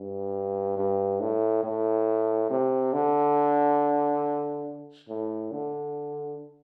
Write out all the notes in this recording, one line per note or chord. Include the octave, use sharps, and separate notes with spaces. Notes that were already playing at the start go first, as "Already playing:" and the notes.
Already playing: G2
G2
A2
A2
C3
D3
A2
D3